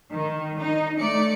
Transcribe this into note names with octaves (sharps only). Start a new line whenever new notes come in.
D#3
D#4
A3 D5 C#7